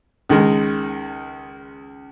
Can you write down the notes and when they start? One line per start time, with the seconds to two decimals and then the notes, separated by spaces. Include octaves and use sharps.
0.29 C#2 D#3 G#3